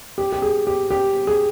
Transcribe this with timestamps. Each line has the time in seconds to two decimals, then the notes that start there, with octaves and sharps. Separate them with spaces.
0.18 G4
0.32 G4
0.42 G#4
0.67 G4
0.90 G4
1.27 G#4